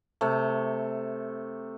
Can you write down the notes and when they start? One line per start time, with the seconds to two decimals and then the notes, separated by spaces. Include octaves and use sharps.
0.21 C3 A3